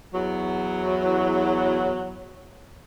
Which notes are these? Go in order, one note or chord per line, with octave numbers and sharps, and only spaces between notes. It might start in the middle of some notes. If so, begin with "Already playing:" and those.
E2 F#3